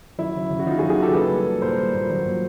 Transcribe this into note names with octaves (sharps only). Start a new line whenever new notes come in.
F#3 E4
C#3
C#3
F#4
F#3 D#4 F4
F#4 G#4
F#3
F#4 G#4
C#3 G4 A4
A#3 A4 B4
G3
A#3
A#2 A#4 C5
G3
A#2
F#3
A#2